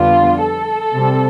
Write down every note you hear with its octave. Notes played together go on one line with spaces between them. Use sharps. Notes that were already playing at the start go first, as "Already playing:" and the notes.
Already playing: F2 D3 G3 B3 D4 F4
A4
C3 G3 C4